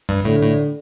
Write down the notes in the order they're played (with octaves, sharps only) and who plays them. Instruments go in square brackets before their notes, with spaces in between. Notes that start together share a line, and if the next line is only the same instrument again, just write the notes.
[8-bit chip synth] G2
[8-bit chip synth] A2 [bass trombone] D3
[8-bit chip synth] A2